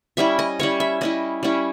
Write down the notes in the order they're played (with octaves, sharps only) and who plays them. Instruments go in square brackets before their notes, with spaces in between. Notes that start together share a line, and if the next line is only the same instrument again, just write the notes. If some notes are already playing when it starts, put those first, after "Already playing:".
[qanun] G3 C#4 E4 E5
D#5
G3 C#4 E4 C#5
E5
G3 C#4 E4 D#5
G3 C#4 E4